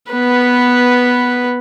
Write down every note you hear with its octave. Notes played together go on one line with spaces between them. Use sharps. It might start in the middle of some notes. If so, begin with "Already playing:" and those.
B3 B4